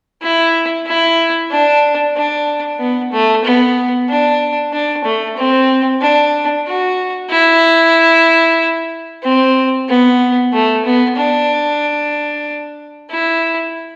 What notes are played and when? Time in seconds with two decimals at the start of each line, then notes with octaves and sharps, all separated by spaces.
0.22 E4
0.87 E4
1.51 D4
2.16 D4
2.80 B3
3.12 A3
3.45 B3
4.09 D4
4.73 D4
5.05 A3
5.37 C4
6.01 D4
6.67 F#4
7.30 E4
9.23 C4
9.89 B3
10.53 A3
10.85 B3
11.17 D4
13.11 E4